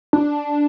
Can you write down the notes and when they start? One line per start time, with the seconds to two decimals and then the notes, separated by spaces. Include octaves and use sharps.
0.13 D4